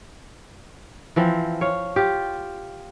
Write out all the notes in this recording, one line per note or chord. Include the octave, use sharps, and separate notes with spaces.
E3 F3 C4
C#5 F5
F4 G4